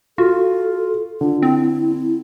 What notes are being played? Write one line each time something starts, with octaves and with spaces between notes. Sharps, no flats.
F4 F#4 A4
D3 F4
C4 E4